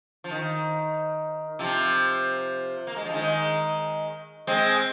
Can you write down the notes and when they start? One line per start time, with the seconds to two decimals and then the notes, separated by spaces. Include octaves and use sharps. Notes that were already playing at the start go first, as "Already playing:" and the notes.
0.24 F3
0.31 D#3
1.59 C3 F3
2.87 A#3
2.96 G#3
3.05 F3
3.13 D#3 G#3
4.47 G#3 C4